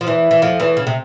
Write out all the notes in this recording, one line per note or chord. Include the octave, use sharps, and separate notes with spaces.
F3
E2 E3
E3
F2 F3
E2 E3
C#3
C3